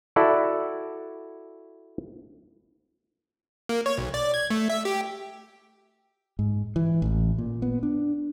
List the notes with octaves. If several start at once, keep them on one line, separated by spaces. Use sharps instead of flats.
E4 F#4 A4 D5
A#3
C#5
B1
D5
G#6
A3
E5
G4
G#2
E3
A1
A#2
B3
D4